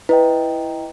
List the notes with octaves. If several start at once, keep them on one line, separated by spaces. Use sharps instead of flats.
E4 B4 D#5 G5